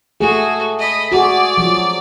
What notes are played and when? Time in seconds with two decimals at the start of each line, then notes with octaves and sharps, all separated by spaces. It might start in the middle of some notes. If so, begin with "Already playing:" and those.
0.21 A3 F#4 G#4
0.79 D#5 B5
1.12 F#4 G#4 D5
1.57 F3 F#3